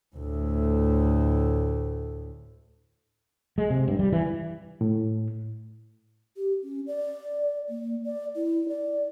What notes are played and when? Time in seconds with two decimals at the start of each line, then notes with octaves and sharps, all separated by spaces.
0.16 D2 A2
3.58 G#3
3.70 C3
3.88 G2
3.99 G3
4.13 E3
4.81 A2
6.37 G4
6.63 C#4
6.87 D5
7.69 A#3
8.05 D5
8.36 E4
8.68 D5